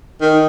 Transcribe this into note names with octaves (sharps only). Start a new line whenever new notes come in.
D#3